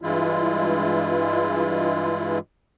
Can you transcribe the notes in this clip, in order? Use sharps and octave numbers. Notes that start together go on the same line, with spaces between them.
G2 E3 G#3 E4 F4